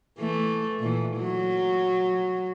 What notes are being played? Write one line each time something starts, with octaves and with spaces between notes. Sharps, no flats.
E3 A3
A#2 E3
F#3